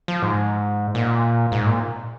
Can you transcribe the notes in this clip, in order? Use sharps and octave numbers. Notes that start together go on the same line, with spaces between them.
F3
G#2
A#2
G#2
A#2